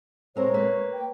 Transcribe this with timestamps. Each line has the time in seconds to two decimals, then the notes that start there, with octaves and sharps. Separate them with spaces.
0.36 G#3 C4 A#4 C#5
0.54 A#3 B4
0.93 G5